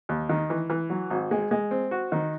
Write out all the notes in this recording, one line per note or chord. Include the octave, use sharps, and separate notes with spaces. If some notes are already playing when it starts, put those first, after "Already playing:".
D#2
D#3
E3
E3
F#3
G#1
G#3
G#3
C4
F#4
D#3